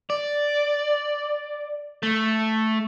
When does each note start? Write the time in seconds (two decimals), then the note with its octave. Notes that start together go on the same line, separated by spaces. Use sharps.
0.10 D5
2.03 A3